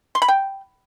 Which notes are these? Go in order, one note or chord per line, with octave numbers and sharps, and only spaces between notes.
C6
B5
G5